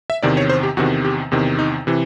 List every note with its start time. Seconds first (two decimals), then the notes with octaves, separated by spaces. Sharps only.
0.10 E5
0.23 E2 C3 D#3 D5
0.37 C#5
0.50 C5
0.63 G4
0.77 E2 C3 D#3 F#4
1.05 G4
1.31 E2 C3 D#3
1.59 D#4
1.87 C3 E3